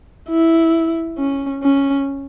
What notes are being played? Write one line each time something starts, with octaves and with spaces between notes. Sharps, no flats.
E4
C#4
C#4